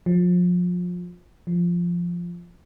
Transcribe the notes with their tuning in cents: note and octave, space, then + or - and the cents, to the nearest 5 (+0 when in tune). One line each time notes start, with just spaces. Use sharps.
F3 +30
F3 -5